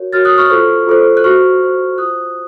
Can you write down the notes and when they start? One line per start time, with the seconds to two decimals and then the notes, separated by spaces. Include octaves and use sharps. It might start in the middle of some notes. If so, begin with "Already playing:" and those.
Already playing: F#4 A#4 C#5
0.13 F#4 A#4 C#5 F6 A6
0.25 D#6 F#6
0.38 C#6 F6
0.50 F4 A4 C5 C#6 F6
0.87 F4 A4 C5
1.17 F#6
1.24 F#4 C5 C#6 F6
1.60 F#4 C5
1.98 F4 C5 D#6 F#6